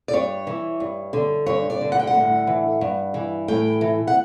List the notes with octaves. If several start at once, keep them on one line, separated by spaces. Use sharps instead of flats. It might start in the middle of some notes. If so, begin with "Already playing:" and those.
D5
G2 C#5
E3
G2
D3
G2 C#5
D5
D3
F#5
G5
F#5
A2
E3
G2
E3
A2 G5
E3
F#5